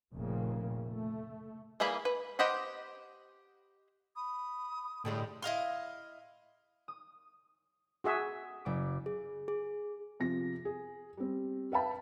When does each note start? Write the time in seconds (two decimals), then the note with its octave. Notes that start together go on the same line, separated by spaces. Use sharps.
0.14 F1 F2 A#2 C#3 A#3
0.83 A3
1.80 E3 G3 A#3 G#4 B5
2.05 B4
2.39 G4 C5 D#5 F#5 B5
4.16 B5 D#6
5.05 A2 D3 G3 G#3
5.42 E4 D#5 F5 C6
6.88 D#6
8.04 F#4 G#4 E5
8.65 F#1 D6
9.06 G#4
9.48 G#4
10.20 C3 F3 A#6
10.65 G#4
11.17 G3 C4
11.72 B4 E5 F5 G5 A5 B5